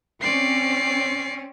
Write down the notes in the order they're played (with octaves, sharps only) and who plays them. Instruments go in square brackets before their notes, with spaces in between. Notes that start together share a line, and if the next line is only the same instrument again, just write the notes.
[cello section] C4 C#4 [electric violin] D5 C7